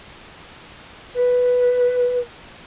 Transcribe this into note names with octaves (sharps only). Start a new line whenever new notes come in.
B4